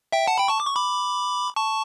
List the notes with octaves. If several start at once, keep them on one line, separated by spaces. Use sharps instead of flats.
E5 G5
F#5 A5
G5 B5
A5 C#6
D6
C#6
B5 D6
A5 C#6